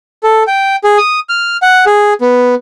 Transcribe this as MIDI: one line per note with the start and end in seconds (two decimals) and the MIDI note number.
0.23 0.43 69
0.47 0.76 79
0.84 0.98 68
0.98 1.20 87
1.29 1.57 89
1.62 1.85 78
1.86 2.14 68
2.21 2.55 59